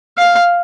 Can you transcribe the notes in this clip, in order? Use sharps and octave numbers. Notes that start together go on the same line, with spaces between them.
F5